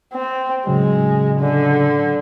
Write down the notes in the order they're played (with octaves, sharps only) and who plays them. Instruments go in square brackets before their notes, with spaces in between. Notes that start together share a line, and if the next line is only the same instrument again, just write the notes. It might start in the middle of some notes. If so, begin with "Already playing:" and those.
[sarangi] C4
[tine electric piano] A2 C#3 F#3 [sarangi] G#3
[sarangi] D3